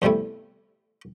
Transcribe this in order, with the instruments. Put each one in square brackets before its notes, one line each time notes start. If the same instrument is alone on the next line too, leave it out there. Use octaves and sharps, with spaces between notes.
[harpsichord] E2 C3 G3 A3 E4